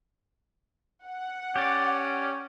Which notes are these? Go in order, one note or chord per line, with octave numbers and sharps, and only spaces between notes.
F#5
C#4 G4 D5